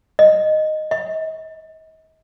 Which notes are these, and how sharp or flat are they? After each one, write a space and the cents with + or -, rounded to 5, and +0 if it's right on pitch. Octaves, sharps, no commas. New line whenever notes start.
D#5 -5
D#5 +40